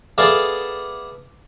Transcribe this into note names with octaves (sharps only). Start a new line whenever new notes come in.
B3 G#4 A4 D5 E5 F5